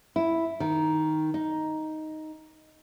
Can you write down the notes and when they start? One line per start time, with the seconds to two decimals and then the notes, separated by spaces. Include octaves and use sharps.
0.16 E4
0.60 D#3
1.34 D#4